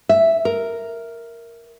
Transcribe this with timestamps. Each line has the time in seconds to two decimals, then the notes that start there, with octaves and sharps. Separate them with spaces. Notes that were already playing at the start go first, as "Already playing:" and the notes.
0.09 E5
0.45 A#4